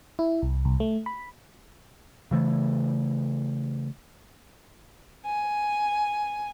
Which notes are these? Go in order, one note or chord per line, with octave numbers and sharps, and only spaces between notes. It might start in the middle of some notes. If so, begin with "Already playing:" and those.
E4
C2
C2
A3
B5
C#3 E3 A3
G#5